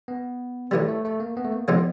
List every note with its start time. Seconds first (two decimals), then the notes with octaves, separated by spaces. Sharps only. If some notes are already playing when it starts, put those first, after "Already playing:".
0.08 B3
0.71 A2 E3 G3 A3
0.89 A3
1.05 A3
1.20 A#3
1.37 B3
1.45 A3
1.52 A#3
1.68 A2 F3 G#3 B3 C4 D#4